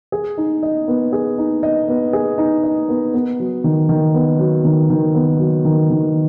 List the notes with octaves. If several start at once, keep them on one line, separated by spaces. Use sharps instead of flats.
G#4
D#4
D#5
B3
G#4
D#4
D#5
B3
G#4
D#4
D#5
B3
B3
F#3
D#3
D#3
B3
F#3
D#3
D#3
B3
F#3
D#3
D#3